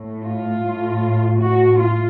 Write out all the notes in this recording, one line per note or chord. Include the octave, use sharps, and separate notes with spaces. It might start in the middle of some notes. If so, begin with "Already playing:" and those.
Already playing: A2
F4
A2
A2 F#4
F4